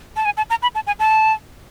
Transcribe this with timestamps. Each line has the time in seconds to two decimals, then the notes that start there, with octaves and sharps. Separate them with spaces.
0.16 A5
0.25 G#5
0.37 A5
0.50 A#5
0.62 B5
0.75 A5
0.87 G#5
0.99 A5